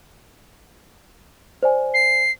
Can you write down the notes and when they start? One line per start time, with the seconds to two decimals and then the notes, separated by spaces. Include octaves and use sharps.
1.63 C5 D5 G#5
1.94 C7